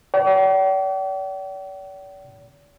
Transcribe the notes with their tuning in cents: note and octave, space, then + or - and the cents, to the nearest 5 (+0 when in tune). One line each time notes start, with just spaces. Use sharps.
D5 -45 G5 -45